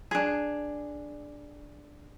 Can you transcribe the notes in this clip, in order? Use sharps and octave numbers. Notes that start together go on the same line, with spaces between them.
D4 G#4